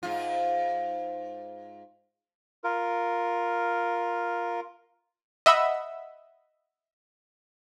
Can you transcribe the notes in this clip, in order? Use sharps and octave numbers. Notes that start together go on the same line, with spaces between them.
G#2 F4
F4 A#4
D#5 E5 F#5 B5 E6